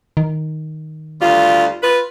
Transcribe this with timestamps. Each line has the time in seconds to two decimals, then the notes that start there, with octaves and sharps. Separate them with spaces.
0.17 D#3
1.21 D2 G3 F4
1.83 F4 B4